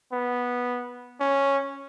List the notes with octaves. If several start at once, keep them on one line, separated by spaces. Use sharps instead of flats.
B3
C#4